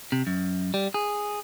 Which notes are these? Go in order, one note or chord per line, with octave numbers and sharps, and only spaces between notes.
C3
F#2
G3
G#4